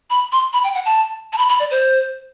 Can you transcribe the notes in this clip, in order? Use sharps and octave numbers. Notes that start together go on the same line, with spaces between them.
B5
C6
B5
G5
F#5
A5
A5
B5
B5
D5
C5